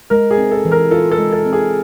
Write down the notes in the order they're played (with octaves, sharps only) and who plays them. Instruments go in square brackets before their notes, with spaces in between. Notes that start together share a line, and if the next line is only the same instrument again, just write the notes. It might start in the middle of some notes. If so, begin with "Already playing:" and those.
[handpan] G#3 [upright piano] A#4
[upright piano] G#4
[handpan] C4
[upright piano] A4
[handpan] E3
[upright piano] A#4
[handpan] F4 [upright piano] A4
[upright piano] A4
[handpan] G#3
[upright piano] A4
[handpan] C4
[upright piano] G#4